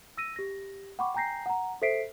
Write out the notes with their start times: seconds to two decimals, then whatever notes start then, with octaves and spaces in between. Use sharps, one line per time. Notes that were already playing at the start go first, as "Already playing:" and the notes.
0.17 E6 A#6 D#7
0.36 G4 A#6
0.99 F#5 G5 B5 C#6 D6
1.14 G5 G#5 A#5 G6 A#6 C7
1.46 F#5 A#5
1.82 A4 C5 E5 B6 C7 D7